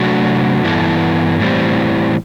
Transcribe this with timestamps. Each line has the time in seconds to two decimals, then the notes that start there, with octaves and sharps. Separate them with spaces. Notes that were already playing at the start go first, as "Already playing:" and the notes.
Already playing: C3 F#3 A3 D4 F#4
0.64 G2 E3 B3 E4 A4
1.40 A2 E3 G3 C4